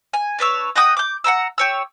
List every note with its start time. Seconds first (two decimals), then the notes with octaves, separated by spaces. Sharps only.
0.13 G#5
0.39 D4 B4 C#5 E6
0.76 D#5 F#5 G5 D#6
0.97 D6 G6
1.24 F#5 G5 A#5 E6
1.58 G4 C#5 E6